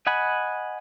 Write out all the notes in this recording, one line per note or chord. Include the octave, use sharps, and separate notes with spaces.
D#5 F#5 G#5 B5